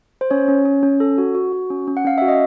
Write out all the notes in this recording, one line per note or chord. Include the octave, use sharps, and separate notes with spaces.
C5
C#4 C#5
C#4
C#4
C#4
A4
F#4
F#4
F#4
C#4
C#4
F#5
C#4 F5
F#4 E5
D#5